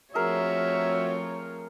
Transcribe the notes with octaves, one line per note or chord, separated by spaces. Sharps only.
F3 A3 C4 F#4 G#4 A#4 C#5 E5